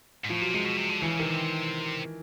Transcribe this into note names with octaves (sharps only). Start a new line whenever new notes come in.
G#2
A2 F3
A#2 F#3
C3 G#3
B2
C3
D3
C#3 E3
C3 D#3